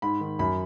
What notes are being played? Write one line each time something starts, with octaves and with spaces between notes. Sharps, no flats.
G#2 B5
D#3
F#2 B5